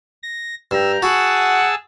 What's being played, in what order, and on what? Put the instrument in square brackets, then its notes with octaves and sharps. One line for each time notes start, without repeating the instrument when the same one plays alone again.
[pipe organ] A#6
[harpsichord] G2 [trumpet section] G5 A#5 [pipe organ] E6
[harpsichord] F#4 [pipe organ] G#4 A5 E6 [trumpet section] F#5